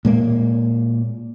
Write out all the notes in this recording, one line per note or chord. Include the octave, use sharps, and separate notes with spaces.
A#2 G#3 A#3